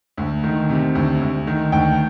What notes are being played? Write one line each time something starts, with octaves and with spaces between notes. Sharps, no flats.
D2
D#3
C3
D2
D2
D#3
D2 G5